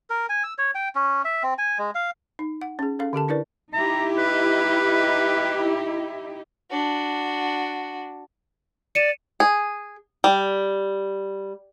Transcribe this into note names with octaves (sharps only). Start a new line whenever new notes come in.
A#4
G#5
E6
C#5
G5
C#4
E5
C4
G#5
G#3
F5
D#4
F#5
C#4 G#4
C#4 A4 F5
D3 G4 A4 A5
D4 E4 A#4 B4 D5
D#4 E4 G4 A#5
B4
D4 F#4
D5 C#7 D#7 E7
G#4
G3